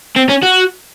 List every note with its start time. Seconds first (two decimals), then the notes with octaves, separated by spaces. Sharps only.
0.16 C4
0.29 C#4
0.43 F#4